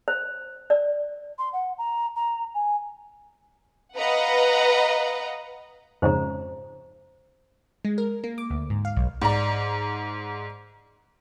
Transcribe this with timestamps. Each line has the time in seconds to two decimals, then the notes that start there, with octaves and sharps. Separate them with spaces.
0.08 C5
0.70 D5
1.38 C6
1.53 F#5
1.78 A#5
2.16 A#5
2.54 G#5
3.97 B4 D#5 F5 F#5 A#5
6.02 F2 G#2 C#3 C5 A#5
7.85 G#3
7.98 A#4
8.24 A#3
8.38 D6
8.50 D2
8.70 G#2
8.85 F5
8.97 B1
9.22 G#2 D5 A#5